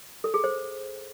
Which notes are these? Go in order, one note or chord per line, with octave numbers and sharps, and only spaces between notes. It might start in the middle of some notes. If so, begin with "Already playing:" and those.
A4
G#4
C5